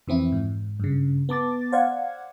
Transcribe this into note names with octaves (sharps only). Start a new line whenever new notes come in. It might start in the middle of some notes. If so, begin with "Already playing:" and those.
F2 E3 C4 E4
G#2
G2 C#3
B3 A5 D6 A6
C5 D5 F5 F#5 G#6